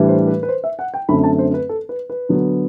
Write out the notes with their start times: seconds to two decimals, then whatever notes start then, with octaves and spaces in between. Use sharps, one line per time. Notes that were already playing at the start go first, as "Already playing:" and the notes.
Already playing: A2 E3 G3 D4
0.08 C5
0.28 B4
0.43 B4
0.49 C5
0.64 E5
0.79 F#5
0.94 G5
1.09 F#2 D3 A3 C4 B5
1.24 A5
1.39 C5
1.54 B4
1.69 A4
1.89 B4
2.10 B4
2.29 D3 F#3 B3